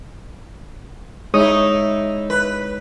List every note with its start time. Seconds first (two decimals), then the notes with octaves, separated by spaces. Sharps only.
1.34 G#3 D#4 E4 C#5 D#6
2.30 B4